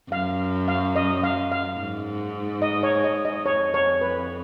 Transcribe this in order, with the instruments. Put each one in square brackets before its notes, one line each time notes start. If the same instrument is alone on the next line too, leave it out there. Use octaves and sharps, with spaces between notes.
[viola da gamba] F#2 [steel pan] F5
[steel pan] F5
D#5
F5
F5
[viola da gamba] G#2
[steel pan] D#5
C#5
D#5
D#5
[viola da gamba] F2 [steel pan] C#5
[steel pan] C#5
B4